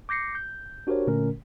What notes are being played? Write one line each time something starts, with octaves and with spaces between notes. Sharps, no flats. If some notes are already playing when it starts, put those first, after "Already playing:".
D6 G6 A#6 C7 C#7
G6
D4 F#4 G4 A#4 C5 C#5
A#2 D3 A3 C#4 A#4